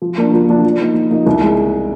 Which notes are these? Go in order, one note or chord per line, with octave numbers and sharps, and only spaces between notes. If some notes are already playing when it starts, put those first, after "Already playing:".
F3
A#3 D4
F3
A#3 D4
F3
A#3 D#4
F3
A#3 D#4
C2
G#3